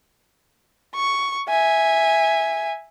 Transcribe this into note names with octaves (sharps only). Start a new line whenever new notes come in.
C#6
E5 G#5